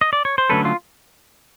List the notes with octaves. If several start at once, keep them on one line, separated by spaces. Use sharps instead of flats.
D#5
D5
C#5
C5
D3 F#3 A3 C#4 A4 B4
F4